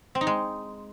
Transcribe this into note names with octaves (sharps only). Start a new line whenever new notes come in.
C4
D#4
G#3